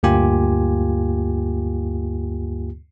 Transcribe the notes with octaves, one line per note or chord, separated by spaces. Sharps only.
D2 G2 A#3 F4 G4 G#5